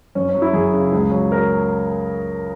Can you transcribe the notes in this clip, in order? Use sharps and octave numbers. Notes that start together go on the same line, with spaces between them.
F#2 C#4
C#4
F#3
E4
F#2 G#4
C#3
C#2
F#3
A#4